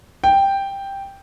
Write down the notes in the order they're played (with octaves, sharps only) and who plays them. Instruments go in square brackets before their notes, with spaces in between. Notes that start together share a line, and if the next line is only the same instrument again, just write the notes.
[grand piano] G5